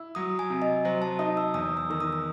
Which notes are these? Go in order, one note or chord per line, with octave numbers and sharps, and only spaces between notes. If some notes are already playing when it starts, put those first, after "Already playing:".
Already playing: E4
F#3 D#6
G#5
C3
D#5
F#3 C5
A5
D#4 D#6
E6
E2 D#6
E6
D#3 E6
D#6
D#6